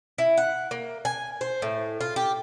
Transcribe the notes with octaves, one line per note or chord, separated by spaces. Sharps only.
E4
F#5
A#3
G#5
C5
A2
F4
G4